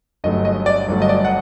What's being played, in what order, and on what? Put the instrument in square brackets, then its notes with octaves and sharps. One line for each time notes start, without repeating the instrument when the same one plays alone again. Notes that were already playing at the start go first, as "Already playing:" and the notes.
[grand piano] G1 G2 F#3 A3 D#5
D#5
D5
G1 G2 F#3 A3
D#5
D5
F#5